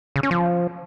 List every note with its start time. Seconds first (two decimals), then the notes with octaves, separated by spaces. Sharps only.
0.16 C#3
0.23 C#4
0.31 F3